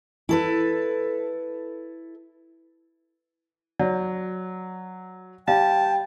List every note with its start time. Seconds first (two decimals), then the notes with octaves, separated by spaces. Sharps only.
0.29 E4 A4 B4
3.79 F#3 D5
5.48 G3 F5 G5 A5